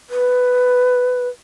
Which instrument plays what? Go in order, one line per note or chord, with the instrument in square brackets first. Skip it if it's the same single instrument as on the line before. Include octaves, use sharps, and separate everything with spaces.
[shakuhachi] B4